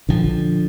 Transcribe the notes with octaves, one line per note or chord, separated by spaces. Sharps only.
A#1 D3 F3